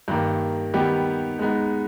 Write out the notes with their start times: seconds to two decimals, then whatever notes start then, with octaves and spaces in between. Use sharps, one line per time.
0.08 G2 D#3 A#3
0.74 D#3 G3 B3 D#4 G4
1.39 G#3 B3 D#4